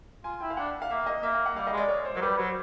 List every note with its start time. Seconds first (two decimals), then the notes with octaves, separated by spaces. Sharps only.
0.24 F4 G#5
0.41 E4 G5
0.50 F5
0.57 D4 F#5
0.82 F5
0.90 A#3 E5
1.06 D#5
1.23 A#3 E5
1.35 F5
1.46 F#5
1.56 G3 F5
1.67 D#5
1.73 G#3 D5
1.88 C#5
2.05 C5
2.15 F#3 A#4
2.22 G3 B4
2.38 F#3 C5